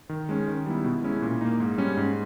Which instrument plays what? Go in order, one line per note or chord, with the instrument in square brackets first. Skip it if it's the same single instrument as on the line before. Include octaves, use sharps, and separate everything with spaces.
[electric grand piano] D#3
G#3 C#4
D#3
G3 B3 E4
B2
G#3 C#4 E4
A#2
A#3 D#4
G#2
G3 C#4
G#2